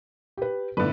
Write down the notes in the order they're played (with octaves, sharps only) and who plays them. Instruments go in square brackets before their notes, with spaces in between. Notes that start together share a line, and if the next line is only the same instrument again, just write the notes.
[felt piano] G4 B4
[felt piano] G1 A2 [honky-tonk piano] D3 B4